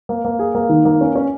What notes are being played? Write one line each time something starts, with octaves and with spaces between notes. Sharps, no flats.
A#3
A#3
G#4
A#3
D#3
A#3
C#4
C#4